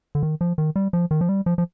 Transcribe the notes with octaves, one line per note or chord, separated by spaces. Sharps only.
D3
D#3
F3
D#3
G3
F3
D#3
F3
G3
F3
F3